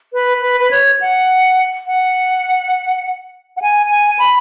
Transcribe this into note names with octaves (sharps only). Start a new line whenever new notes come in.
B4
B4
B4
C#5
F#5
F#5
F#5
G#5
G#5
B5